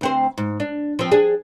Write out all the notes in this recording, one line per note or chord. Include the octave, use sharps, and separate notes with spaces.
D2 C4 C5
G#2
D4
F3 C4
D4 G#4